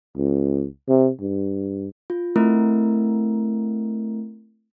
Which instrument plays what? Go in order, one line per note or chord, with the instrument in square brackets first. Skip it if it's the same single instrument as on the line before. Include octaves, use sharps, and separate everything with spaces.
[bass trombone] C#2
C3
G2
[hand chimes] F4
A3 C4 E4 A#4